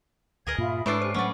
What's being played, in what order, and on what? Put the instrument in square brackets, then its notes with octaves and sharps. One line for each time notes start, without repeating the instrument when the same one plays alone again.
[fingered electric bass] D2 [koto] G#4 A#4 D#5 [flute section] B4 G#6
[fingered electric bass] G2 A#2 A#3 [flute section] F4 E5 B5
[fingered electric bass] G#2 [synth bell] G#3 B4 C7 [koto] A3 D4 [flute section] E4
[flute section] C#4 G4 [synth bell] C5
[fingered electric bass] A2 F#3 A3 [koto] C#4 D5 [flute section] F#5 B5 C#6